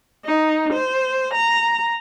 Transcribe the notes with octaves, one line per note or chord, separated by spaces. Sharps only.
D#4
C5
A#5